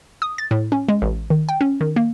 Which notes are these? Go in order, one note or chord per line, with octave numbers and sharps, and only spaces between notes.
D#6
A6
A2
C#4
G#3
A1
D#3
G5
C#4
D#3
A#3